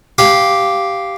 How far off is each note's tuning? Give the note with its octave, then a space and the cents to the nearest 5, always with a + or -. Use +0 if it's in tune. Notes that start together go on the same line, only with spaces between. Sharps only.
G4 -5 F5 -5